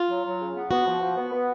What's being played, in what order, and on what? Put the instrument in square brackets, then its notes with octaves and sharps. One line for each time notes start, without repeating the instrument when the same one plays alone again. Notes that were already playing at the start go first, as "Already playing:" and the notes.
Already playing: [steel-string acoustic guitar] F4
[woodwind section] F#3
F#3
C#3
B3
[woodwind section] B3 [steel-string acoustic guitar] F#4
[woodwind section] F3
F3
B3
B3